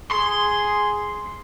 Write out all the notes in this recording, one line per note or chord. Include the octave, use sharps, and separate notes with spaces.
G#4 C6